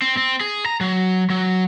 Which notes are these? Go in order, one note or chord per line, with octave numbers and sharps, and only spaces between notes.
C4
C4
G#4
A#5
F#3
F#3